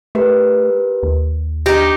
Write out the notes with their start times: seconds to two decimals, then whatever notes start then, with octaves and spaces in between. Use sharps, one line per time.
0.15 A3 G4 A#4 B4
1.03 D#2
1.66 D4 D#4 G4 A#6